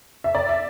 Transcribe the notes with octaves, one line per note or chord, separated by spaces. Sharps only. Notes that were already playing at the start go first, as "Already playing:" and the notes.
E5
D5
E5